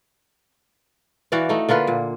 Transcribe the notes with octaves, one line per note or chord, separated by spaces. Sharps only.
E3 F#4 D5 F5
A3 D#4
D3 A#3 F4 B4
A#2